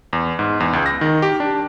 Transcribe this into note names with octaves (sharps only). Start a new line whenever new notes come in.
E2
G#2
E2
C#2
A#6
D#3
G4
D4